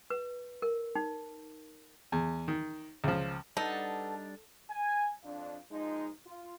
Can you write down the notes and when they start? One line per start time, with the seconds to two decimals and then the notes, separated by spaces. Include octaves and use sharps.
0.10 B4
0.62 A#4
0.95 D#4
2.12 E2
2.48 D#3
3.04 C#2 F3
3.57 G3 D4 D#4 A4 B4 F#5
4.70 G#5
5.24 F2 D4 F5
5.71 A#2 F3 G#3 D#4
6.27 F4